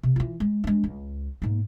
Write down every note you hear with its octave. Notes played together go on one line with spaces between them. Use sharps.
C3
E3 F4
G#3
G#3 D4
C#2
G#2 A#3